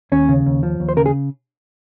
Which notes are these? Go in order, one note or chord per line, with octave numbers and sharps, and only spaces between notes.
D#2 C#4
C#3
D#2
F3
D#2
C5
C#3 A#4
G#4